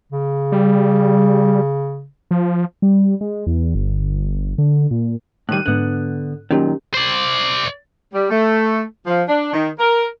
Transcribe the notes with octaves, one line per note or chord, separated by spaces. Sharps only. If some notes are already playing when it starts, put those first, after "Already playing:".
C#3
G3
F3
G3
G#3
E2
G1
D3
A#2
A2 D#3 G3 F#6 D#7
G#2 D3 B3 F#6
F#2 A#2 D#3 C#4 G4
C5 D5
G3
A3
F3
D4
D#3
A#4